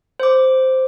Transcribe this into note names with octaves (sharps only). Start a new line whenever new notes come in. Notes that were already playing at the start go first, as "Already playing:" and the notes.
C5 D6